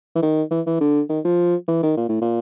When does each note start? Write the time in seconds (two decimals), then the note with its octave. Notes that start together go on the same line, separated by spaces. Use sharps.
0.15 E3
0.22 D#3
0.51 E3
0.67 E3
0.81 D3
1.09 D#3
1.25 F3
1.68 E3
1.83 D#3
1.97 A#2
2.09 A2
2.22 A#2